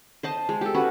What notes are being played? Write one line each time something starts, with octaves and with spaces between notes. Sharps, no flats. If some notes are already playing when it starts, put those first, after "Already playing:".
C5 D#5 A5
G#3
G4 A4
C#4 F#4 B4